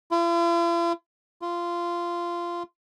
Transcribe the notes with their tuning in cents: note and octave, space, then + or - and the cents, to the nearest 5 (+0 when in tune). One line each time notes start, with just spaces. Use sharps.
F4 -45
F4 -15